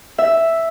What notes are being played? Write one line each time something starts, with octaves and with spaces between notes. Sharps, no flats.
E5